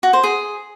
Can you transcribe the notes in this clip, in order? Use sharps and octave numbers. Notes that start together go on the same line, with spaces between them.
F#4
C5
G#4